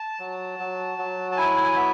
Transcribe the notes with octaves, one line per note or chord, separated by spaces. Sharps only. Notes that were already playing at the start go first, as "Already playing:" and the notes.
Already playing: A5
F#3
F#3
F#3
A5
E4 G#5
B3 E5